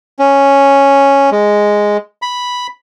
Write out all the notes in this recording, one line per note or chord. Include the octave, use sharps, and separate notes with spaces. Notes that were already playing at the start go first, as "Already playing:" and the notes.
C#4
G#3
B5